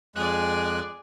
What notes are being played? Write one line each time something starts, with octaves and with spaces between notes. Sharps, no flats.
F2 G#3 G#4 D5 F#6